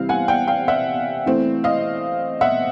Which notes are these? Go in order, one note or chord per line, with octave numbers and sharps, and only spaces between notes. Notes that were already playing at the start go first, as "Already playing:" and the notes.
Already playing: C3 E3 G3 C4 F5
F#5 G#5
F5 G5
F5 G5
E5 F#5
E3 A3 C4
D#5 F5
E5 F#5